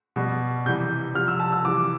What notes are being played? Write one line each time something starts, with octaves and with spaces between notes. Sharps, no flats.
B2 G3
C3 E3 G3 G6
C3 F3 F6
E6
A5
E6
C3 E3 G3 D6